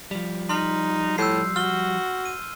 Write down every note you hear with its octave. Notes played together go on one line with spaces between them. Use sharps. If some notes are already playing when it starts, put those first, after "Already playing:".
F3 G3
D#4 C6 F6
A2 E6 G6 C7
F#4 F6 G7
D#7